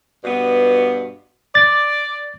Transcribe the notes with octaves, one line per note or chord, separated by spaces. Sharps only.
G2 B2 B3
D5 A6